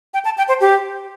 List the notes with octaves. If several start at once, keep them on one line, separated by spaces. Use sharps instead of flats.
G5
A5
G5
C5
G4